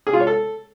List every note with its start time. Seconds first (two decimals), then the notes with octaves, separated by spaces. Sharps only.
0.07 G#4
0.13 F4
0.20 C#5
0.27 A4